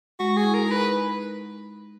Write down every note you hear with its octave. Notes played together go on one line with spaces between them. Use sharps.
G#3 F#4
G#4
E4
A#4
D#4
B4